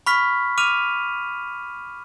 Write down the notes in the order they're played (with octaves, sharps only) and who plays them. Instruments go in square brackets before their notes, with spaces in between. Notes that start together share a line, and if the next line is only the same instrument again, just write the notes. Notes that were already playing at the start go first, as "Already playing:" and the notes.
[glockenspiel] B5 C#6 F6 B6
D6 F6 D#7 F7